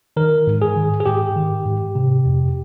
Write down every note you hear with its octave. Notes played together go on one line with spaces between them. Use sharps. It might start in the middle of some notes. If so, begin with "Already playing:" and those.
D#3 A#4
G#2
G#4
D#3
G#4
G#2 G4
D#3
G#2
C3
F2